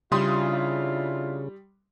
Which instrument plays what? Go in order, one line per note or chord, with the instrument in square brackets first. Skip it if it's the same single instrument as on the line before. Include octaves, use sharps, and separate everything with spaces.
[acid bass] C#3 [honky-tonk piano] G3 C6 D#6 [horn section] D4 E4 F4